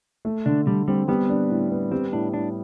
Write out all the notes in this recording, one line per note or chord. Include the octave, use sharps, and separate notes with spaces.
A3
D3 D4
D3 G3
G3 C4
G3 B3
D4
A2
B3
G3 C4
A2 D4
A2 D4